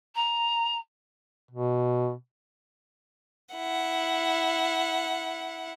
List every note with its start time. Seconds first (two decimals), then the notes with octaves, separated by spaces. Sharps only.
0.15 A#5
1.51 B2
3.55 E4 F#5